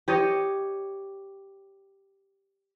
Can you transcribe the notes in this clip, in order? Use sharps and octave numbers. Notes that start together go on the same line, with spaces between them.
G4 C#5 D#5